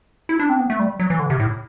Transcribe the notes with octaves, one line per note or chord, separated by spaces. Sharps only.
E4
D4
C4
B3
A3
G3
F#3
E3
D3
C3
A2